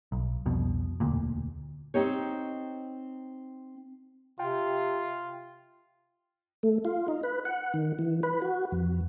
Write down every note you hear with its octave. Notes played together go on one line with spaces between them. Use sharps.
B1
C2 F2 B2
E1 D2 A#2
C4 D#4 G4 C#5
C3 F4 G5
A3
F4
D#4
B4
F#5
D#3
E3
B4
F#4
F2